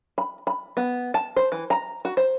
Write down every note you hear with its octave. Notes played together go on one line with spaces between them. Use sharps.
B5
B5
B3
A5
C5
E3
A#5
F#4
C5